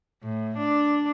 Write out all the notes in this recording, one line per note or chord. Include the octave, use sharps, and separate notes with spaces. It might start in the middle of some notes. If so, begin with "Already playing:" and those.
A2
D4